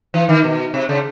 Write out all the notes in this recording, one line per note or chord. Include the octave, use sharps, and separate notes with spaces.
E3
D#3
B2
C3
C#3